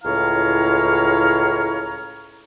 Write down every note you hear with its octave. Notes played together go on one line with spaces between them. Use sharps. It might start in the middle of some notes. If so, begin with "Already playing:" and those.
C#2 A2 E4 C#5 F5 A#5